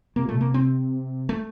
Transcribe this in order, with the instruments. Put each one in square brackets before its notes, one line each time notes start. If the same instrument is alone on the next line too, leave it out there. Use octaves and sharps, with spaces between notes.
[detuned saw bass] C3 [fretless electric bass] A#3
[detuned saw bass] A#2
[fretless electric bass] A3
[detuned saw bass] C3
[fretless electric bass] A#3
C4
A3